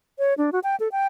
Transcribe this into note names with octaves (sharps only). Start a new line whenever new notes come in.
C#5
D4
F#4
G5
A4
G5